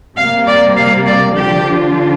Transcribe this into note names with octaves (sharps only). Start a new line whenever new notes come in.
C3 G3 A#3 F5
D5
F5
D5
D3 F3 D4 F4 G4